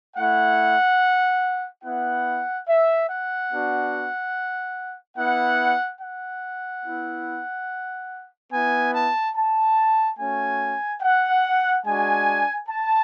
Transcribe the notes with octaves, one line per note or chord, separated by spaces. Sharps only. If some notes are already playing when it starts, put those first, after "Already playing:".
A3 E4 F#5
B3 E4 F#5
E5
F#5
B3 D4 F#4
B3 E4 F#5
F#5
B3 E4
B3 E4 G#5
A5
A5
A3 C#4 F#4 G#5
F#5
G#3 D4 F#4 G#5
A5